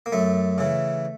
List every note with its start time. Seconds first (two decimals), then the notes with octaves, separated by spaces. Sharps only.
0.06 A#3
0.13 F#2 A3
0.58 C#3 E3